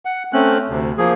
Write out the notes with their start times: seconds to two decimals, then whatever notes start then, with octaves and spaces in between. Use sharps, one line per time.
0.05 F#5
0.33 A3 C4 C#4 F#6
0.69 D2 C3
0.98 F3 A#3 G#4